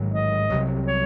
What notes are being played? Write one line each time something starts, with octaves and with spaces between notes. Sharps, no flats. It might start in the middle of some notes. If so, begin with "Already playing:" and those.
Already playing: A1 G#2 D#3 F#3
D#5
C2 C3 F#3
C#5